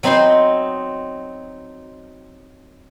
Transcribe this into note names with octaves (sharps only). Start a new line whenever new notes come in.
F#3 C4 D#4 B5 C6